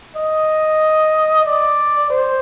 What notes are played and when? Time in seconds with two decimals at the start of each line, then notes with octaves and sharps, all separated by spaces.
0.16 D#5
1.46 D5
2.10 C5